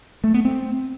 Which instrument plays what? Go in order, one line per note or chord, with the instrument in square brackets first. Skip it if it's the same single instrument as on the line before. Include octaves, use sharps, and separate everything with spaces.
[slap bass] A3
B3
C4